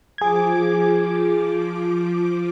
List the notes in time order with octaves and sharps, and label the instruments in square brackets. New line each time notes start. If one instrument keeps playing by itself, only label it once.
[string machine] F3 D6 [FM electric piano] G#4 G#6